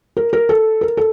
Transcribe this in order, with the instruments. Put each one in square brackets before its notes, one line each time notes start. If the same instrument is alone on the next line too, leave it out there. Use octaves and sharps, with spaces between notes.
[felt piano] A#4
A#4
A4
A#4
A4